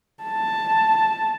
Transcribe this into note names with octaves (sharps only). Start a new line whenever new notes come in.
A5